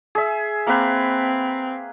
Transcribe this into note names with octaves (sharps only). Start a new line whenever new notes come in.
G#4 E5
A#3 C4 B4